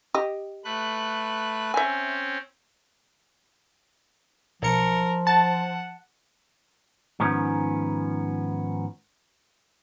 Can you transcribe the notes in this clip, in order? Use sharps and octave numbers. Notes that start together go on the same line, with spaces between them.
G4 D#5
A3 B4 F#6
C4 C#4 E5 G#5
B1 F3 A#4 C#7
F#5 A5
G#2 D#3 F3 B3 C#4